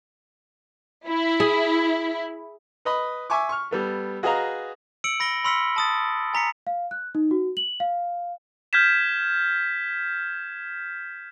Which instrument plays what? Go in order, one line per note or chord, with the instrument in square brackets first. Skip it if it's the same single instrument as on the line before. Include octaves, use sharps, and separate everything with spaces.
[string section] E4
[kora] G#4 E5
[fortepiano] B4 D#5 B5
E5 G#5 C#6 D6
C#6 F6
G3 B3 A4
F#4 G#4 B4 D#5 F5 A#5
[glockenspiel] E6 C#7 D7 F#7
B5 A#6 D7 G7
B5 C6 E6 F6 B6 C#7
A5 D#6 A6
G#5 A#5 B6 C#7
[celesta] F5
F#6
D#4
F#4
F#7
F5
[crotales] F6 G6 G#6 B6 E7